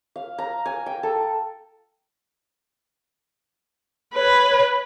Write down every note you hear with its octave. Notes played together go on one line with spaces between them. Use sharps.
F5
A#5
G#5
G5
A4
B4 C#5